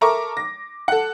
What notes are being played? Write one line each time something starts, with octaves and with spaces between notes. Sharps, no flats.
A4 A#4 E5 A#5 C#6 D6
A#6
A4 F#5